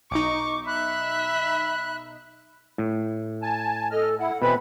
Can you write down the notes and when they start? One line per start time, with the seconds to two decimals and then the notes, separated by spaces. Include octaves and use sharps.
0.11 B1 D#4 C#6 D6
0.67 E5 B5 F#6
2.78 A2
3.42 G#5 A5
3.91 A4 D#5 F6
4.19 E4 F#5
4.42 B2 E3 C4 B4 B5